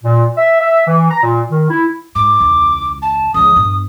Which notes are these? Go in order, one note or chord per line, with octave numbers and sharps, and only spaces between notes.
A#2
E5
E5
E3
A#5
A#2
D#3
E4
G#2 D6
E1 C#2
A5
C#2 F3 D#6
G2 B3